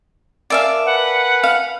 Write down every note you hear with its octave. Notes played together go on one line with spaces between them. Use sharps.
A#4 D5 E5 F5 G#5 A5
B4 F#5
F5